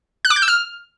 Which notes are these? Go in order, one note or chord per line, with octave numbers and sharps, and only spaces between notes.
F#6
D6
G6
E6
F6